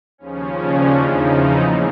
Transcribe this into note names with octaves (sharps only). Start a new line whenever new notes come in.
D#2 C#3 F3 C#4
D4
E2 C#3 F3 D#4
E4
G#2 E3 A#3